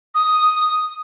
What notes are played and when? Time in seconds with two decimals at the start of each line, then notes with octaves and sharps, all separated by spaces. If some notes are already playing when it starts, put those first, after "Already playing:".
0.14 D#6